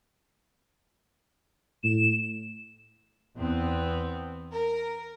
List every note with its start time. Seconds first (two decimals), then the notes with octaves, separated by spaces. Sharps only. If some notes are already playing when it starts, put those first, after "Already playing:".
1.84 A2 E7
3.36 E2 B3 C4
4.52 A#4